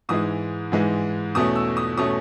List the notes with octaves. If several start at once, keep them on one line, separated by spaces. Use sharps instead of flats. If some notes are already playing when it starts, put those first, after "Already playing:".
G#2 E3 G#3 D#6
G#2 E3 G#3
E2 B2 A3 C#4 D#6
E6
D#6
B2 A3 C#4 D#6